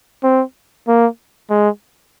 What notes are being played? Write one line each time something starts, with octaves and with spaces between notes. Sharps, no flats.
C4
A#3
G#3